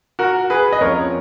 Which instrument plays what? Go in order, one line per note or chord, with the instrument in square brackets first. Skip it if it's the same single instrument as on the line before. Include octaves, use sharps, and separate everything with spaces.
[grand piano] F#4 A#4
G#4 B4
D#5
F2 F3 A#3 C#4 A#4 C#5